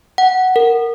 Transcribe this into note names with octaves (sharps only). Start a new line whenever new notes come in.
F#5
A#4